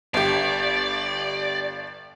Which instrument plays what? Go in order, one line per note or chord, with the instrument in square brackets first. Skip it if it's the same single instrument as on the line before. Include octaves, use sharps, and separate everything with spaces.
[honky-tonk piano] G1 G4 [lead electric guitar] D5